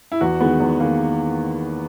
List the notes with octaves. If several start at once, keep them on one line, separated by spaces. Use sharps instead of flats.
E4
E2 F#4
D#3 G#3 B3
E2
D#3 G#3 A#3